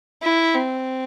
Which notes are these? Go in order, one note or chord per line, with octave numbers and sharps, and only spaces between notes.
E4
C4